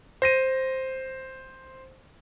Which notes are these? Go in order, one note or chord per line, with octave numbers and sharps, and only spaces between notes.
C5 A#6 D#7